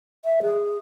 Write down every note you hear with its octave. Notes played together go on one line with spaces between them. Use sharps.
E5
G#4